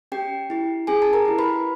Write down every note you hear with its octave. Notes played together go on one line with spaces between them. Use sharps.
C#4 G4 G5
E4 G4
C#4 G#4 G#5
A5
A#4 A#5
E4 G4
B4 B5